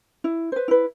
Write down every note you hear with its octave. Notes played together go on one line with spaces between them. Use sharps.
E4
B4 C5
E4 B4